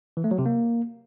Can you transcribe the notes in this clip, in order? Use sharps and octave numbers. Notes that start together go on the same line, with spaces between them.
E3
A3
F#3
C3
A#3